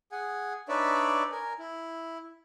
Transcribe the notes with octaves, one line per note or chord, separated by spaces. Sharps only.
G#4 F#5 G#5
D4 D#4 B4 C#5 D5 E5
A#4 G#5
E4